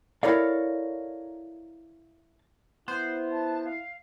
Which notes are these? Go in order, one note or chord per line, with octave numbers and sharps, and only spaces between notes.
E4 A4 A#4 C#5 D5 F5
B3 E4 C5
A5
F5